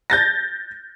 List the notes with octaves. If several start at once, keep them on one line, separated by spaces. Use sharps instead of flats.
G6 A6 A#6